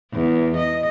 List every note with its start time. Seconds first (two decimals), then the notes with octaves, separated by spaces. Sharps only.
0.13 E2
0.57 D#5